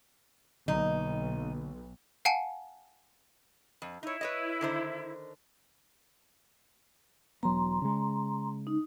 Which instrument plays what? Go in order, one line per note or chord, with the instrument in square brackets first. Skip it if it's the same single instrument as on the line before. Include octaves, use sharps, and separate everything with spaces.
[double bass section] B1 [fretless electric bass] D3 F#3 A#3 [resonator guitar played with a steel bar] D#4
[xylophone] F5 F#5 G#5 A5 C#7 D#7
[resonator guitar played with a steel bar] F2
[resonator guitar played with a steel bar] D#4 C#5 [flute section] E4
[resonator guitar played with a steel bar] B4 C#5 D#5
D3 D#3 C5
[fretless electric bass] E1 F#3 B3 [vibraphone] A#5 C6
[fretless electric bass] C#3 G#3
[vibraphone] D#4